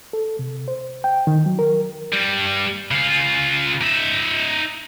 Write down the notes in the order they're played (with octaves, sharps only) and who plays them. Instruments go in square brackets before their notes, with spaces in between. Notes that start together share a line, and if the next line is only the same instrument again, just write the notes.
[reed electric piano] A4
C3
C5
G5
D#3
F#3
A#4
[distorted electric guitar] G2 G3
C#3 F4
D#4 E5